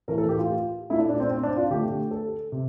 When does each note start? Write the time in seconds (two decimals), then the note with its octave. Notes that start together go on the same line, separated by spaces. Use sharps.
0.08 A2 E3 A3 A#4
0.18 A4
0.29 G4
0.38 F4
0.90 A#2 A3 E4
0.99 D4
1.09 D4
1.20 C4
1.31 C4
1.43 D4
1.57 F4
1.70 D3 A3 G4
2.11 A4
2.52 C3